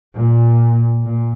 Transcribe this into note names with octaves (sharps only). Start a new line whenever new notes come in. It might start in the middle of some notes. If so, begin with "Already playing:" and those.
A#2
A#2